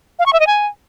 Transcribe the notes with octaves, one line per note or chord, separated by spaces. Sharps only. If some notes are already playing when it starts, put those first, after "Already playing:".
F5
C#6
E5
D#5
G#5